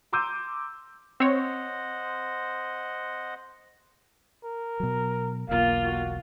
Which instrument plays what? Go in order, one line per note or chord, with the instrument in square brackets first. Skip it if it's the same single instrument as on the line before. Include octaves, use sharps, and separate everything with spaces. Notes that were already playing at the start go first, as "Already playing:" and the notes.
[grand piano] A#5 C6 D6 E6 G6 D#7
[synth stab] C4 C#5 [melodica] C5 D#5 F#5
[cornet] A#4
[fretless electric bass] B2 F#3
[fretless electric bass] E1 B1 [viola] A#3 F4 [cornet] F5
[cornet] F#4